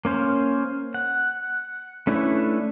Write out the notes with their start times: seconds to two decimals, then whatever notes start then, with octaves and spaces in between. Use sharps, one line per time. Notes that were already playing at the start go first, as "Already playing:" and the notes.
0.05 A#3 C#4 C5 F5
0.94 F#5
2.07 A3 C#4 D4 E4 B4